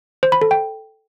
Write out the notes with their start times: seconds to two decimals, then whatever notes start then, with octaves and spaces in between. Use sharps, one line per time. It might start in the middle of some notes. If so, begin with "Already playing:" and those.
0.23 C5
0.32 B5
0.42 A4
0.51 G5